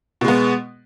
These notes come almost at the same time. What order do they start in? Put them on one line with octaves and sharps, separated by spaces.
B2 G#3 B3